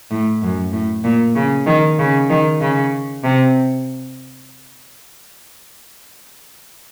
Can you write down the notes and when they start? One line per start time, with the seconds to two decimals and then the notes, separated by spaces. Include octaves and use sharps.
0.11 A2
0.42 F#2
0.72 A2
1.04 A#2
1.35 C#3
1.66 D#3
1.99 C#3
2.30 D#3
2.61 C#3
3.24 C3